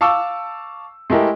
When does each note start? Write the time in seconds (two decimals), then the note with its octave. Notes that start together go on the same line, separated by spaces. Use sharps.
0.01 F5 A5 C#6 D6 E6
1.10 G#3 A3 E4 G4 A#4